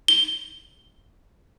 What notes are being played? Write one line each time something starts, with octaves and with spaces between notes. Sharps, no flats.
G7